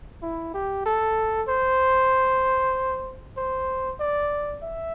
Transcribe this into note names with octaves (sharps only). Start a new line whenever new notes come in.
E4
G4
A4
C5
C5
D5
E5